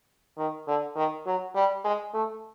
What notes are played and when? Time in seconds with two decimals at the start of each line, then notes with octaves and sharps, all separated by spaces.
0.38 D#3
0.67 D3
0.96 D#3
1.26 F#3
1.55 G3
1.84 G#3
2.14 A3